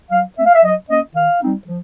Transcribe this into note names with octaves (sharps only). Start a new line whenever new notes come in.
F#3 F5
A3 C4 E5
F5
E5
F#3 D#5
A#3 C#4 D#5
D#3 F5
G3 C4 D#4
F3